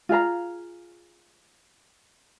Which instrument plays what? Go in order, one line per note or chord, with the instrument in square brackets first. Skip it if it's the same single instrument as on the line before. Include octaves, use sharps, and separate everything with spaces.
[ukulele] F4 G#4 F5 A#5